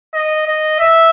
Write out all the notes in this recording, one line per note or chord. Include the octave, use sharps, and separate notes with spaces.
D#5
D#5
E5